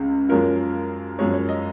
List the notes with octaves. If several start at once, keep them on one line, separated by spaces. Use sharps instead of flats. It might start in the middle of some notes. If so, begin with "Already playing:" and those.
Already playing: C#2 C#3
F#2 F3 G#3 C#4 F4 A#4
F#2 F3 G#3 C#5
C#5
D#5